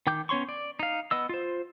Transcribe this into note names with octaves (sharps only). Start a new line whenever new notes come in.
D#3 G5 D6 G6
B3 C#4 C#5 C6 C#6
D5
D#4 F5
B3 D#5 E6
F4 C5